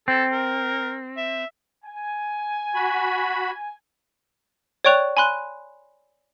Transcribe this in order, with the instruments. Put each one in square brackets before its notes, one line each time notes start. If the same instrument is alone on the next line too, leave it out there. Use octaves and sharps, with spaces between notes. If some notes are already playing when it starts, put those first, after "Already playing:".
[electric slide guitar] C4 [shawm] A4
[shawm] A#4
E5
[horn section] G#5
[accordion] F#4 B5
[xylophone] C#5 D5 G5 C#6 F#6 F7
G#5 B5 C6 F#6